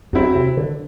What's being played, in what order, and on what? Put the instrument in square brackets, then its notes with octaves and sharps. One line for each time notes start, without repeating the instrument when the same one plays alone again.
[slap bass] E2 [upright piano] F#3 C4 E4
[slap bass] C3
D3